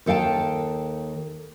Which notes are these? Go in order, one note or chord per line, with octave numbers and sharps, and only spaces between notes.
D#2 A4 F5 G5 A5